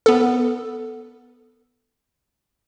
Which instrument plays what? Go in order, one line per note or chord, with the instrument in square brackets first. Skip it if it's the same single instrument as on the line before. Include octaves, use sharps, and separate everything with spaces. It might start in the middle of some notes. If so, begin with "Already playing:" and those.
[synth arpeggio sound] B3 A4